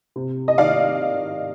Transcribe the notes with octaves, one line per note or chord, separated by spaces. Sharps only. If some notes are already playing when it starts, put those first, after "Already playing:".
C3
D#5
D#3 D5 F5